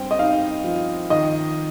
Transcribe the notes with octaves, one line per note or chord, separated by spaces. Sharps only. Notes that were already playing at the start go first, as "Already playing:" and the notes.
Already playing: G2 C4 G5
D#5
D#4 F5
F3
D#3 D#5